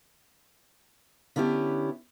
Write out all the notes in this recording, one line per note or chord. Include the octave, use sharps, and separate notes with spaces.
D3 B3 C#4 E4 G4